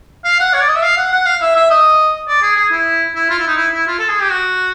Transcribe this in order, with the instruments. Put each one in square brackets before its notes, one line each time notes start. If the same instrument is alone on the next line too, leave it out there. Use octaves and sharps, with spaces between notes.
[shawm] F5
F#5
C#5
D5
D#5
E5
F5
F#5
F#5
F5
E5
E5
D#5
D5
G#4
G#4
E4
E4
F4
E4
D#4
E4
E4
F4
A4
G#4
G4
F#4